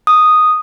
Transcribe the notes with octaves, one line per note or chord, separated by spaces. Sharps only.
D#6